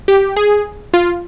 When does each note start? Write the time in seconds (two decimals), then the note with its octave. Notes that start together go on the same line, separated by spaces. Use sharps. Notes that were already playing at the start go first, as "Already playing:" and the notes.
0.08 G4
0.36 G#4
0.94 F4